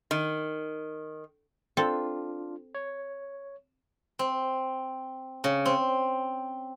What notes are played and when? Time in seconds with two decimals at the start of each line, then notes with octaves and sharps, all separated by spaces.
0.11 D#3
1.77 C4 D4 F4 A4
2.75 C#5
4.19 C4
5.44 C#3
5.66 C4